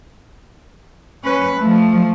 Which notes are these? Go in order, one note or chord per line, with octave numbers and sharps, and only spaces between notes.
C#4 B4
F3 A3